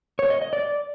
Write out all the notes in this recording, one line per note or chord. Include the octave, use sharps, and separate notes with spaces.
C#5
D#5
D#5
D5